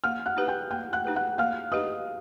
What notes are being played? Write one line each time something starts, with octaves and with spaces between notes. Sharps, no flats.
A#3 F5 F6
F#5 F#6
D#4 G4 B4
G5 G6
A#3 G5 G6
F#5 F#6
D#4 G4 B4
F#5 F#6
A#3 F5 F6
D#4 G4 B4 D#5 D#6